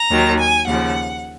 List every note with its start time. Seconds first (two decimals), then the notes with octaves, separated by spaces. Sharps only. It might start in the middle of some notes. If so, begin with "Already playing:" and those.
Already playing: A#5
0.11 D#2 D#3 F#3
0.39 G#5
0.67 D#2 C#3 F3 F#5